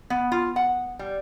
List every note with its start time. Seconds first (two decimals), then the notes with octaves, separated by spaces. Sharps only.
0.10 B3
0.32 F4
0.56 F#5
0.99 G3